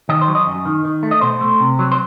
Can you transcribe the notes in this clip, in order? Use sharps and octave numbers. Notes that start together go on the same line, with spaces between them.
D#3 D#5
C5
F#3
D#5
F#2
D#3
D#3
A3
D#5
B2 C5
A3
C3
F#3
C5